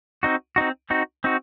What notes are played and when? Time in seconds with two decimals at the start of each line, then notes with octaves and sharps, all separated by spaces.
0.23 C4 D#4 F#4
0.56 C4 D#4 F#4
0.90 C4 D#4 F#4
1.24 C4 D#4 F#4